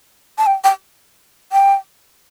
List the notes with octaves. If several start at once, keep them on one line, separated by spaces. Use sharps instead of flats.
A5
G5
G5
G5